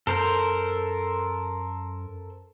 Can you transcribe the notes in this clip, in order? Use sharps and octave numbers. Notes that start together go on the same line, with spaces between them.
F#2 A4 A#4 C5